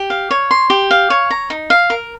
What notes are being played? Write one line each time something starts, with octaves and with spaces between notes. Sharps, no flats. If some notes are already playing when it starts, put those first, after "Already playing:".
Already playing: G4
F5
C#5
C6
G4
F5
C#5
A#5
D#4
F5
A#4